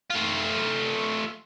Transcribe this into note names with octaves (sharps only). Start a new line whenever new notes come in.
A3 F4